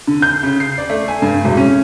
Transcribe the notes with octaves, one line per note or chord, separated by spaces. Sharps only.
D3
G6
C#3
C7
D5
A3
G#5
G2
E1
C#4